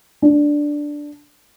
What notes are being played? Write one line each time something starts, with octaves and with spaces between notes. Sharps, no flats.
D4